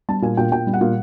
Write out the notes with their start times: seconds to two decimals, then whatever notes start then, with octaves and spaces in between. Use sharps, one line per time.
0.09 G3 A5
0.22 A#2 G#5
0.37 A#2 G5
0.52 A#2 G5
0.67 G3
0.73 F#5
0.81 A#2